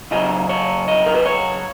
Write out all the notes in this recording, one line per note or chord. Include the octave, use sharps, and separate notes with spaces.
C#3 F#3 D#5
C#5
D#5
A#4
B4
C#5